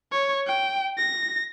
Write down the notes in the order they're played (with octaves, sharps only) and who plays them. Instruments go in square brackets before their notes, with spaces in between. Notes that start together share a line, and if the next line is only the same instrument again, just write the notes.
[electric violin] C#5
G5
A#6